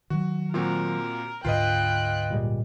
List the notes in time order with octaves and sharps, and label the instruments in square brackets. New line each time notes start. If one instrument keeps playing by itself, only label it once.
[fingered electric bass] D#3 F#3 [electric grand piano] F#4
[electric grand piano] A#2 A#3 C4 [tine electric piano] F4 F#4 [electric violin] A#4
[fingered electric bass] D2 G#2 [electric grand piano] F4 B4 D#5 [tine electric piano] F5 [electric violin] G5 F#6
[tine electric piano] A#2 G3 G#3